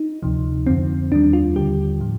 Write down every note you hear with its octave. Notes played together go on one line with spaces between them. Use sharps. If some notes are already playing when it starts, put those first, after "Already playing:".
Already playing: D#4
D2 C3 F3
F2 D3 F3 C4
D#2 D#3 G3 D4
F4
D#2 D3 G3 G4
A2 F3